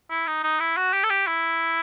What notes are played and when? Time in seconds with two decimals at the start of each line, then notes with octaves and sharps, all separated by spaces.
0.10 E4
0.27 D#4
0.44 D#4
0.60 E4
0.77 F#4
0.93 G4
1.04 A4
1.10 G4
1.27 E4